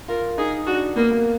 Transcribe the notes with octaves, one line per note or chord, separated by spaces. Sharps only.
F4 A#4
D#4 G#4
D4 F#4
A#3 B3
A#3